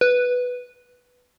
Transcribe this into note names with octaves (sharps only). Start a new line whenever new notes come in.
B4